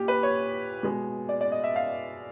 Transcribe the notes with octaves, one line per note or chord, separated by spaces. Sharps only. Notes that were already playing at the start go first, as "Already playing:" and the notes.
Already playing: A#2 G4
B4
C#5
B2 G#3
D5
D5
D#5
E5
F5